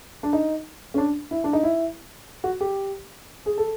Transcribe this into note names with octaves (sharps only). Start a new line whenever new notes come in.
D4
D#4
C#4
D4
E4
D4
D#4
E4
F#4
G4
G#4
A4